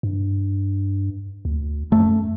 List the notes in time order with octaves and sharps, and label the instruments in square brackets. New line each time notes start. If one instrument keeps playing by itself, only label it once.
[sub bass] G2
D2
[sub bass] F#2 [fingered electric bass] A3